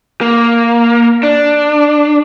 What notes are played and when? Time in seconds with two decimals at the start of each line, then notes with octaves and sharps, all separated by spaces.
0.21 A#3
1.23 D4